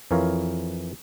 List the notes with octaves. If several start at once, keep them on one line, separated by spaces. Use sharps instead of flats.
F2 E3 A#4 C#5 F5